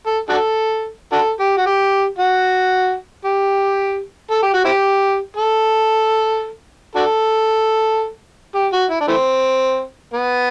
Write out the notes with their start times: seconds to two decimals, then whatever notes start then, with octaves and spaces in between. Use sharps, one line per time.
0.07 A4
0.29 D4 F#4 A4
1.12 D4 F#4 A4
1.40 G4
1.57 F#4
1.66 G4
2.19 F#4
3.25 G4
4.31 A4
4.42 G4
4.53 F#4
4.65 C4 E4 G4
5.37 A4
6.95 D4 F#4 A4
8.55 G4
8.73 F#4
8.90 E4
9.01 D4
9.08 E3 A3 C4
10.13 B3